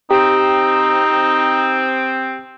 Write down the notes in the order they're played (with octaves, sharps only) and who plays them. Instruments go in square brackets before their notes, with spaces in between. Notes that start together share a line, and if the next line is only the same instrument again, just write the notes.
[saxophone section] C4 [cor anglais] D#4 [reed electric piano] G4